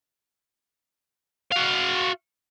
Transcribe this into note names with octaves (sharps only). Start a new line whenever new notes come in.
F#4 F5